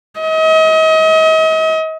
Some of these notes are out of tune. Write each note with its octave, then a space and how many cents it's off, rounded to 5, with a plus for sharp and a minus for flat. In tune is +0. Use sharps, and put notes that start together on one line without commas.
D#5 +40